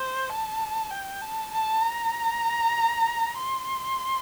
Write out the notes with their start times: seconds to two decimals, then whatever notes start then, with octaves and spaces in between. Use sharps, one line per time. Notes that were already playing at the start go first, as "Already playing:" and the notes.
Already playing: C5
0.29 A5
0.91 G5
1.21 A5
1.52 A5
1.82 A#5
3.37 C6